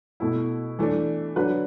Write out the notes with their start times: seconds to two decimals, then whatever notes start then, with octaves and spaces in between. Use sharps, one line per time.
0.20 B2 A3 E4
0.79 E3 A3 D4
1.36 D3 F#3 D4 F#4 B4